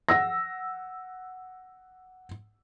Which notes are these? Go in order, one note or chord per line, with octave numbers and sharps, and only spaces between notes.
F#5 E6 A#6